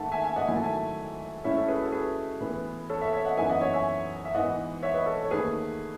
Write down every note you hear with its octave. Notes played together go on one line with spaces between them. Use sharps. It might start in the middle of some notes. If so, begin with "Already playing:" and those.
Already playing: G#2 D#3 A3 D#4 E5 F#5 A5
E5 G#5
E5 G#5
D#5 F#5
G#2 D#3 F#3 A3 E4 G#5
A5
E5 G#5
A2 G#3 C#4 E4 C#5 E5
A4 C#5
G#4 B4
F#4 A4
G#4 B4
A2 E3 B3
A4 C#5
C#5 E5
C#5 E5
D#5 F#5
F#2 E3 B3 D#4 E5 G#5
D#5 F#5
C#5 E5
E5 G#5
E5
G#2 E3 B3 D#5 F#5
C#5 E5
B4 D#5
A4 C#5
C#5
D#2 D#3 A3 G#4 B4